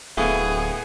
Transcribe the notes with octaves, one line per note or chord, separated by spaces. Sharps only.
D1 A2 A3 B3 G#4 F5